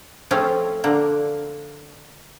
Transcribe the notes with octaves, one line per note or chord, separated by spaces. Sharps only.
F3 A3 C4 C#4 F4 G#4
D3 A#3